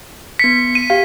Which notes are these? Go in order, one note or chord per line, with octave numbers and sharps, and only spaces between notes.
B3 B6 C#7
D#7
G4 F5